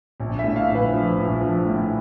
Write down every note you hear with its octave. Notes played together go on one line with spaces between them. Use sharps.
A#1
A2 E5
F5
A#1
B4
F3
A#1
F3
A2